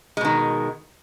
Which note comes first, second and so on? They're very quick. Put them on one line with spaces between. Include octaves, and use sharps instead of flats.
G#3 B2 D#3